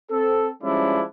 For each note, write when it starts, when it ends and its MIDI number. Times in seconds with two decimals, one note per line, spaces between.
0.11 0.48 60
0.11 0.48 69
0.62 1.01 53
0.62 1.01 55
0.62 1.01 56
0.62 1.01 61
0.62 1.01 62
0.62 1.01 64